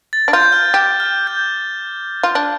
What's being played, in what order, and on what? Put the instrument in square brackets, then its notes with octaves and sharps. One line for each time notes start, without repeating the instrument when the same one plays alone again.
[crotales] A6
[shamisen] D4
[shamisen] F4 [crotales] G6
[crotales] F6
[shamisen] G4 [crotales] D6
[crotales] F6
G6
[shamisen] F4
D4